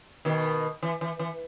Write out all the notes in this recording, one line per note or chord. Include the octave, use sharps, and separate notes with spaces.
B2 D#3
E3
E3
E3